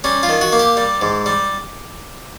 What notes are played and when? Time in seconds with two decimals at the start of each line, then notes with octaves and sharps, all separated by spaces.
0.04 G3 C#4
0.23 F4
0.29 D#3
0.41 F#4
0.52 A#3
0.59 G4
0.77 G3
1.01 G#2
1.26 G3